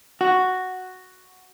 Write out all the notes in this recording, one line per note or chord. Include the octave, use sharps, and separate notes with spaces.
F#4